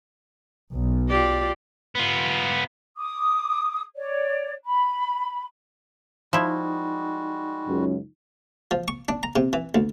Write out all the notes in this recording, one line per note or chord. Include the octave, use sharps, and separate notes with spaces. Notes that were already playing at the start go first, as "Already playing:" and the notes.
B1
F4 G4 D5
B3 F4
D6 D#6
C#5 D5
B5
F3 G3 G#3 D#4 E4 F#4
C#2 F#2
F3
C#6
D4
A#5
C3
E3
D2